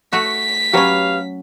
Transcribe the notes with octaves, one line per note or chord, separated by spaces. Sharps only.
A3 F#4 B6
F#3 C#4 G4 B4 F5